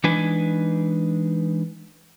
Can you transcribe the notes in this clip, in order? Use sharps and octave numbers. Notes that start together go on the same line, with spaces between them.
E3 G#3 D4 D#4 B4 G#5